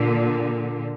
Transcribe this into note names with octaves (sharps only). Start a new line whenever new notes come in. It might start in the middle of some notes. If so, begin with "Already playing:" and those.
Already playing: A#2 D3